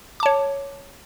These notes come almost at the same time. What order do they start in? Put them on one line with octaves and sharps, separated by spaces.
D6 A5 C#5